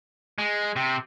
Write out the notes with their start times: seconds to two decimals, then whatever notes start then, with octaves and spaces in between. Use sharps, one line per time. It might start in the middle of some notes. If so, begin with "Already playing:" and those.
0.38 G#3
0.76 C3